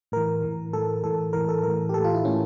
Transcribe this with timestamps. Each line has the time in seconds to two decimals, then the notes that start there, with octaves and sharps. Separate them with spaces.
0.12 A2 E3 A#4
0.43 A2 E3
0.73 A2 E3 A4
1.04 A2 E3 A4
1.33 A2 E3 A#4
1.49 A4
1.63 A2 E3 A#4
1.89 G4
1.94 A2 E3 A4
2.04 F4
2.14 E4
2.24 A2 E3 C#4